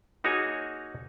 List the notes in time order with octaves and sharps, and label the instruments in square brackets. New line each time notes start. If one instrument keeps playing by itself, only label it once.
[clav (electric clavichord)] A#3 D#4 F#4 G#4 C#5 G#5